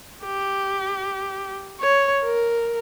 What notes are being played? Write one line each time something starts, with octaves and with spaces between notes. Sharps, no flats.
G4
C#5
A#4